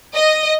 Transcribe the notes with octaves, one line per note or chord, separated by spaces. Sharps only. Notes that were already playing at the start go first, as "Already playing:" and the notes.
D#5